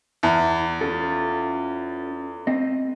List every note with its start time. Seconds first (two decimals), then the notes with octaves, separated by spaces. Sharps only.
0.23 E2
0.81 C#4 F4 A4
2.47 C4 D#5